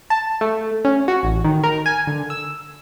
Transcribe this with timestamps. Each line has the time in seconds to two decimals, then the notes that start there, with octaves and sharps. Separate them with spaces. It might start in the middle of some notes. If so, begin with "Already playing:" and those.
0.10 A5
0.41 A3
0.85 C#4
1.08 F#4
1.23 A1
1.44 D#3
1.64 A#4
1.86 G#5
2.07 D3
2.30 E6